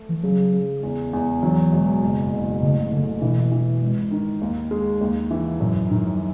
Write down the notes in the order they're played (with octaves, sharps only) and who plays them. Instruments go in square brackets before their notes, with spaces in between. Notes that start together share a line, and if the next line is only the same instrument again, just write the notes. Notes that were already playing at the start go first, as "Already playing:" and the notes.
Already playing: [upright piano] A3
[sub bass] E3
[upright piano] C#3 [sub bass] F#3
[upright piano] C#3
E2
E2
[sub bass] E3 [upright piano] F#3
[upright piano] E1
F#1
F#1
[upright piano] A1 [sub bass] C#3
[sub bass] C#3 [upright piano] A3
[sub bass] B2 [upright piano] E3
[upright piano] E3
G#1
D#3
D#2
G#3
D#2
E3
[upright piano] F#2 [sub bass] A2
[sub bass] G#2
[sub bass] A2 [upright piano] D#3
[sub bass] F#3